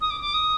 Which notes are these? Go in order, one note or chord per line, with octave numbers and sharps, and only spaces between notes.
D#6
D6
D6
D#6